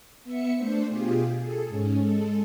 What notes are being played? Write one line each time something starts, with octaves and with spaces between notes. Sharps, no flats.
B3 E5 C#7
A3 D4 C5
B2 F4 G4 G#4
G#4 A4
G#2 C#4
G#3 A4